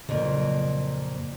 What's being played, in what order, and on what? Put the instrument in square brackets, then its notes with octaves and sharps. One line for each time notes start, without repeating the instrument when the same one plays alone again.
[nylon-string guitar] F2 A#2 [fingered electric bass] C#3 F3 F#3